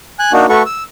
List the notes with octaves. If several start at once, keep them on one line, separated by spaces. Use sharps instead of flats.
G#5 F#6
A#3 D4 D#4 F#4
A3 F#4 A4 B4 C#6
E6